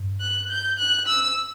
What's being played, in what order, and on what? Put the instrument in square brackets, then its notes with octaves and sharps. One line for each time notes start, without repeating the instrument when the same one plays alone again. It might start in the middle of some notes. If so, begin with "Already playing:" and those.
Already playing: [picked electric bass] G2
[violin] F#6
G6
F#6
E6